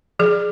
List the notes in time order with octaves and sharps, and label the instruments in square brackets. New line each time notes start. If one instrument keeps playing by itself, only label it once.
[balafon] F3 G#4